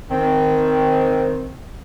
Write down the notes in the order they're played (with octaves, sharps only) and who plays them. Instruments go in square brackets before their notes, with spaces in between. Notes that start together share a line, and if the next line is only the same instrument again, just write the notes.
[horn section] D#3 C4